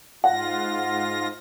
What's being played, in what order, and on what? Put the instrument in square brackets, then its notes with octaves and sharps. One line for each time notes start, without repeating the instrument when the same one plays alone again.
[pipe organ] G#2 F4 A#6 [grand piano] F#5